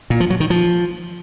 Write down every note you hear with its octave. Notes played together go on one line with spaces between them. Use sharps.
A#2
F3
F#3
D#3
F3